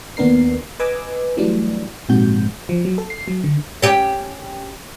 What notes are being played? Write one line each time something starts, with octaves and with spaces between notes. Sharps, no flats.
D#2 B3 D4 A#4 C7
B4 D#5 G#5 D6 E6
E3 F#3 G3 A3 D4
A#1 G#2 C3 F#4 G6
F3
F#3
A4
C7
F#3
D3
C#4 G4